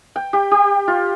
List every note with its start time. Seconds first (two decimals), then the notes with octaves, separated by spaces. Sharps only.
0.16 G5
0.33 G4
0.51 G4
0.88 F4